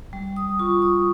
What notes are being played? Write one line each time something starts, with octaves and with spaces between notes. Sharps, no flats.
G3
D#6
F4 C#6
D#6